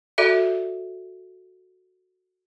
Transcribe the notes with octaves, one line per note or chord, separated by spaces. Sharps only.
F#4 A4 D5 E5